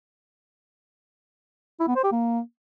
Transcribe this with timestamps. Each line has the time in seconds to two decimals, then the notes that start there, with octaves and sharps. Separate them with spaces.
1.80 E4
1.88 B3
1.96 C5
2.04 G4
2.12 A#3